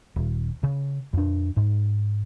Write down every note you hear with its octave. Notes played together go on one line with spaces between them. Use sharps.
D#1
C#3
F2 D4
G#2